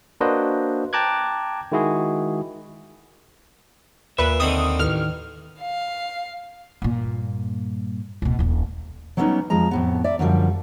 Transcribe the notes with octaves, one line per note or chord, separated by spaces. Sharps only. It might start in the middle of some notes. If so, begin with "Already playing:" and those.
A#3 D4 F#4 B4 C5 D#5
G5 A5 A#5 D6 F#6 G#6
D#3 G#3 E4 F#4 G#4
D#2 A#2 B4 E5
D3 D#3 C4 D#6
A1 D#3 F6
F5
G2 A#2
D1 B2
D#1 A#1
F#3 G3 A3 B3 C#4 D#4
F2 F3 G#3 A#5
F2 A2 B3
D5 E5
F#2 D3 E3 F3 G3